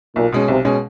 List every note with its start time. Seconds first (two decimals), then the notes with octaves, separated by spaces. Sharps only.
0.16 B1 A#2
0.32 B2 G#3 C#4
0.48 B1 C3
0.65 B2 G#3 C#4